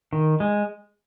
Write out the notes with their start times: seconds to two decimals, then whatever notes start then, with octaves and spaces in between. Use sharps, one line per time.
0.13 D#3
0.40 G#3